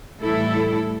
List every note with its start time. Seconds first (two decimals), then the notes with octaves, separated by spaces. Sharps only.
0.23 A2 E3 G3 E4 A4